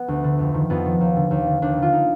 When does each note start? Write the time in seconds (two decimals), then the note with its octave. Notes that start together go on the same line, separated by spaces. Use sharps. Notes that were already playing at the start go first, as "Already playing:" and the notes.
Already playing: B3
0.08 D2
0.24 D3
0.39 F2
0.54 D#3
0.70 F2 B3
0.85 D#3
1.00 D#2
1.16 D3
1.31 D#2
1.47 D3
1.62 D#2 D4
1.78 D3 F4
1.93 D#4